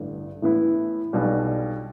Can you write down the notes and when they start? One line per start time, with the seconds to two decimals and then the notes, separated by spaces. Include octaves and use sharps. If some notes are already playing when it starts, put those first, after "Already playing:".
Already playing: A1 G2 D3
0.42 A2 E3 B3 E4
1.13 B1 B2 G3 D4 F4